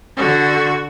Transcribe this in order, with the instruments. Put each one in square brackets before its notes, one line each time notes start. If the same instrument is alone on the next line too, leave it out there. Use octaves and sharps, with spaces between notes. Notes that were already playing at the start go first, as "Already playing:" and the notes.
[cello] D3 [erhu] F#4